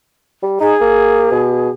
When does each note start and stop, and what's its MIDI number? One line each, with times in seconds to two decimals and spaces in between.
0.42 0.59 55
0.60 0.75 63
0.60 1.71 68
0.81 1.28 58
1.31 1.70 47